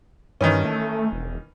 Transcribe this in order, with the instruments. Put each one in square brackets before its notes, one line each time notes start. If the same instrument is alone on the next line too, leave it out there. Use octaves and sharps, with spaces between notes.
[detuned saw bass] G2 [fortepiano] D#3 E3 C#4
[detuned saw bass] A3
E1